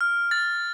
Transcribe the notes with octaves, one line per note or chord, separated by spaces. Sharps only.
F6
A6